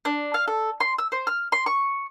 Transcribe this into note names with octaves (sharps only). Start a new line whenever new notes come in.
D4
F5
A4
C6
E6
C5
F6
C6
C#6